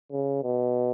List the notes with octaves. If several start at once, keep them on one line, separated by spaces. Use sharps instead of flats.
C#3
B2